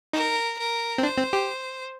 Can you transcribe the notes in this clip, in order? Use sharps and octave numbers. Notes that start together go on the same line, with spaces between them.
D#4 A#4
A#4
C4
D4 C5
C4
G4